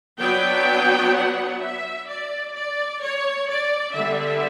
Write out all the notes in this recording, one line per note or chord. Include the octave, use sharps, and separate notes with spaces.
F#3 B3 D4 G5
F#5
E5
D5
D5
C#5
D5
D3 G3 B3 E5